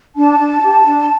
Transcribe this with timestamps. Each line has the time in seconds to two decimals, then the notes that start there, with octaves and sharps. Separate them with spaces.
0.16 D4 A5
0.39 D4
0.62 G4
0.85 D4